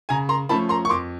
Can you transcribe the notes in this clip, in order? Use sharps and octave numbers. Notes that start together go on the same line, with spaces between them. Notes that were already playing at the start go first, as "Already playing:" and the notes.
C#3 G#5 A#5
A#5 C6
F3 A3 C#4 A5 B5
A#5 C6
C#6
F2 C6 D6